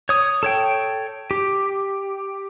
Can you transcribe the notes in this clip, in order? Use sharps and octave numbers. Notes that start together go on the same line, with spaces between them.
C#5 D#6
A4 C#5 G5
G4